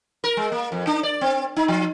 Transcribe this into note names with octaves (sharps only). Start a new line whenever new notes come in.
A#4
G#3
A#3
F2
D4
D5
C4
D#4
F3